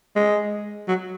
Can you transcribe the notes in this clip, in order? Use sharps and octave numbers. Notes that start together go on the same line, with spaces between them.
G#3
F#3